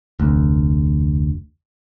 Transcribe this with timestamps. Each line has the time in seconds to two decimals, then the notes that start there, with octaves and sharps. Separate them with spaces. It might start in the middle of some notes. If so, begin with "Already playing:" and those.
0.20 F1 D2